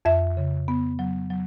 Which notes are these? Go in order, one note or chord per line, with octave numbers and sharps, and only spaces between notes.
F2 E5
C#3
B3
F#3
F#3